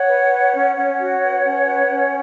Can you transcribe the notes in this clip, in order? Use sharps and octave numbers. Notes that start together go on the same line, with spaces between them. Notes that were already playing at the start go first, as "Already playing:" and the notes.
Already playing: C#5 F#5
B4
B4
C#4
C#4 C#5 F#5
F#4
B4
C#4
B4
C#4